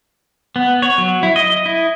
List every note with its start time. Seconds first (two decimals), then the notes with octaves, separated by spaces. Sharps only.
0.56 B3
0.82 C#5
0.98 F#3
1.23 E4
1.36 D#5
1.66 E4